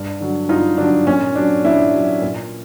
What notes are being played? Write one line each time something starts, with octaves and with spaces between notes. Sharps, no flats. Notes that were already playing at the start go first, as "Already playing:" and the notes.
Already playing: G2
D3 F#3
G2 D#4 F4
D3 F#3 D4
A#2 C#4
F#3 D4
A#2 D4 E4
F#3
A#2